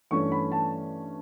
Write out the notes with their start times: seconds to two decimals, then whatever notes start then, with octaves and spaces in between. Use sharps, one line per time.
0.11 G2 E3 A3 C#4 C#6
0.32 B5
0.52 A5